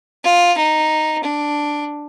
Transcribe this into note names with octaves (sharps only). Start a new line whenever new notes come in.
F4
D#4
D4